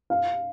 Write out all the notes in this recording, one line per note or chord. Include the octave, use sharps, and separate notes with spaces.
F5